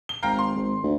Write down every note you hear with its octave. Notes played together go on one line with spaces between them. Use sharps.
G7
G#1 F5 G5 A#5
C6
G#1
D2